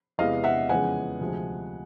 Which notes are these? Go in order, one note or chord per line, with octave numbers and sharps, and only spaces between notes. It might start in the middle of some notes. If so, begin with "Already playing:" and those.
E2 C3 E3 G#3 B3 D#5 F5
E5 F#5
F2 C#3 E3 G#3 B3 F#5 G#5
D2 C3 F3 G#3